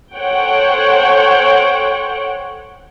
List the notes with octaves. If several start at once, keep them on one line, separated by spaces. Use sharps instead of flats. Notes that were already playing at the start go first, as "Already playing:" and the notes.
A4 C5 C#5 F#5 G5